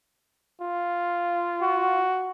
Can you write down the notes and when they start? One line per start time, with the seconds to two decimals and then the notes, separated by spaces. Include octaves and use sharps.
0.62 F4
1.61 F#4